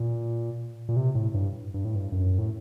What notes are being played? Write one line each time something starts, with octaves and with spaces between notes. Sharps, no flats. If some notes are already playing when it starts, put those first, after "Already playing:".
Already playing: A#2
A#2
C3
A2
G2
G2
A2
G2
F#2
A2